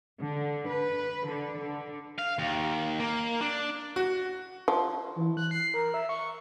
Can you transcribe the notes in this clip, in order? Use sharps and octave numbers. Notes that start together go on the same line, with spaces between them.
D3
B4
D3
D3
F5
D#2
A#3
D4
F#4
F3
E3
F#6
C7
A#4
E5
C#6